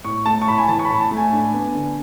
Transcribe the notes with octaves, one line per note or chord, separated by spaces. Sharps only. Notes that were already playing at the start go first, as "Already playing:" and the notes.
A2 C#6
A3 A5
C#6
A2 B5
G#5
E3 A5
C#6
B5
A2
A5
A3
G#5
D4
B3
D3